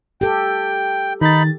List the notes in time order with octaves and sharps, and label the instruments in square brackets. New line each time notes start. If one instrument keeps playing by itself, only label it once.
[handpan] G4 A4 [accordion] G5
[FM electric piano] D#3 A6 [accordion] D#4 B5